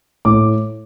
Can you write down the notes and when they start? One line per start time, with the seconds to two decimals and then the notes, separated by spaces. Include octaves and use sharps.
0.25 A2 D6